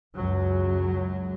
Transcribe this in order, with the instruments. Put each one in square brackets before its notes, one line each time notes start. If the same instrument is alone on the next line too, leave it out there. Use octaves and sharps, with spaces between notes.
[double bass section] C#2 F#2 F#3